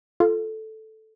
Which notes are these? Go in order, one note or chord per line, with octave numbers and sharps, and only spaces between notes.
F4 A4